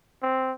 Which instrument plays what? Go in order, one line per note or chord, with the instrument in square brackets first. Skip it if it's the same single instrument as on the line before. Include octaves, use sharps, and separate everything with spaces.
[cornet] C4